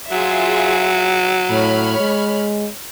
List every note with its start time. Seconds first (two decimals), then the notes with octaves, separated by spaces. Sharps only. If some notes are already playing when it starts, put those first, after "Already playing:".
0.11 F#3 F4 G#4 E5
1.50 A2 C#5 B5 F6
2.00 G#3